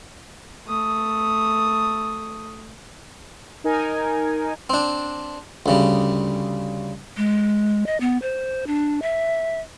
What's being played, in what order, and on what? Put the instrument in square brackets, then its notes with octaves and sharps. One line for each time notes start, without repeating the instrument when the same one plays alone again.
[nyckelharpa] A3 D#6
[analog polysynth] D#4 A#4 G#5
[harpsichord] C4 D4
D2 C#3 G3
[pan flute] G#3
D#5
B3
C5
D4
E5